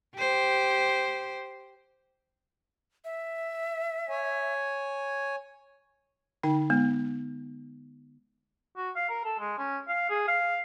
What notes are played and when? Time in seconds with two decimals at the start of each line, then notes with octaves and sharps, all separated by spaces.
0.17 G4 C5
3.05 E5
4.09 C#5 G#5
6.43 D3 D#4 G5
6.70 G#3 B3
8.77 F#4
8.96 F5
9.10 A#4
9.25 A4
9.39 G#3
9.58 C#4
9.88 F5
10.10 G#4
10.28 F5